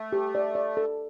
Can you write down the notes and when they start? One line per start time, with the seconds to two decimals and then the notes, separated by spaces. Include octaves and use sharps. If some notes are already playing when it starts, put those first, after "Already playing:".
Already playing: A3
0.12 G4
0.35 D5
0.55 D5
0.77 A4